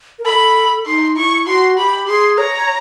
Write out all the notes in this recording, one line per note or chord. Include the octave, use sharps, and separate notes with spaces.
A#4
A4 B5
D#4 C6
E4 C#6
F#4 C6
G4 B5
G#4 C6
C#5 A#5